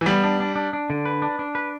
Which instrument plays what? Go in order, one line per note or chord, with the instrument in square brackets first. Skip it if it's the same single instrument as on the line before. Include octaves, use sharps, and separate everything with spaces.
[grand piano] E3
[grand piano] G3 [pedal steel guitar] B3
[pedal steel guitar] D4
D4
D4
D4
D3
B4
D4
D4
B4